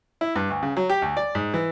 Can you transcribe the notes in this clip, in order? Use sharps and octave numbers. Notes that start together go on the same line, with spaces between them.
E4
G2
D2
C#3
F#3
G4
D2
D5
G#2
E3